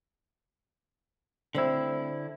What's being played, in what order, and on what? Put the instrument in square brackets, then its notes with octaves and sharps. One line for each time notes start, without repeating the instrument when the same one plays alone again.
[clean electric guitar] D3 E4 [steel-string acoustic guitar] G3 A3 C4